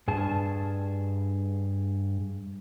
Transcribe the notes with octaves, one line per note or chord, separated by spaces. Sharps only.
G2 G#4 A5